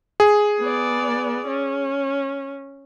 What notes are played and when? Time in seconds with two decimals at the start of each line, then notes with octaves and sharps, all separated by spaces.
0.20 G#4
0.60 B3 D5
1.47 C#4